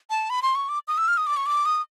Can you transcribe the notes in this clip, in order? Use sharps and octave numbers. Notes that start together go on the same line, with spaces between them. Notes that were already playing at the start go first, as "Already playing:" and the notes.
A5
B5
C6
C#6
D6
D#6
E6
F6
D#6
D6
C#6
D6
D#6